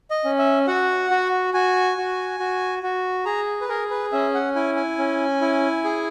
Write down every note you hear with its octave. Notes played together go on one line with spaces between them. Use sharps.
D#5
C#4
E5
F#4 F#5
F#4
F#4 G#5
F#4
F#4
F#4
G#4 A#5
B4
G#4 A#4
B4
C#4 E5
F#5
E4 G#5
G#5
C#4
E4
G#4